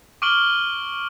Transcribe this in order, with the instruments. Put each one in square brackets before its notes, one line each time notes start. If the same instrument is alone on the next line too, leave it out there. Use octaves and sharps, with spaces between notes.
[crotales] C#6 D6 F6 D7 F#7 G7